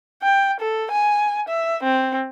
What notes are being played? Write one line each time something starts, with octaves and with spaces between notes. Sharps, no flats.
G5
A4
G#5
E5
C4